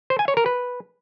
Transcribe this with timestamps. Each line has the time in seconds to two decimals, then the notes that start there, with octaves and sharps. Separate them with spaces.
0.10 C5
0.19 G#5
0.28 C#5
0.37 A#4
0.46 B4